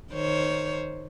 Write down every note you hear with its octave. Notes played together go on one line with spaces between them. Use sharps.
D#3 C5 C#5